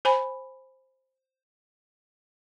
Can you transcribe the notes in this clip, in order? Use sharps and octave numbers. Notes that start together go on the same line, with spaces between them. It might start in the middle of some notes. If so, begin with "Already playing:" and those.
C5 G#5 B5